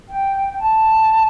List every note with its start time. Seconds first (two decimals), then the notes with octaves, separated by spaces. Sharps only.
0.09 G5
0.49 G5
0.59 A5